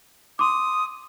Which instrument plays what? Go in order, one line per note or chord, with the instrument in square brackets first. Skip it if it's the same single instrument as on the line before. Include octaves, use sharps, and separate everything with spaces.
[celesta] C6 D6 [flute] D#6